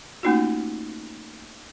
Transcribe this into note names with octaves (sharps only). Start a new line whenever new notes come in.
A3 A#3 C#4 D#4 F4 F#4